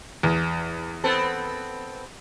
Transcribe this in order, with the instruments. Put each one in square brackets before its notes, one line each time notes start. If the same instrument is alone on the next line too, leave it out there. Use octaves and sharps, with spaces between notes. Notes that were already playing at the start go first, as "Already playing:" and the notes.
[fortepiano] E2
[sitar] B3 C4 A4